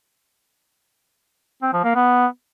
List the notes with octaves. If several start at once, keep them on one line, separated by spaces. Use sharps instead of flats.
C4
F3
A#3
B3